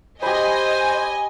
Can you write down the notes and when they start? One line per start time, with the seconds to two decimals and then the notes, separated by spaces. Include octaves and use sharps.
0.23 G4 C5 D#5 G#5 B5